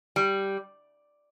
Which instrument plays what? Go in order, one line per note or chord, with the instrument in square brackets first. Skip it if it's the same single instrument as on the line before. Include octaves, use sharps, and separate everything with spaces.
[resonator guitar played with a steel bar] G3